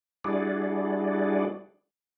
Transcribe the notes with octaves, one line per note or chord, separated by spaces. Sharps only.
G3 D4 E4 F#4 G#4 D5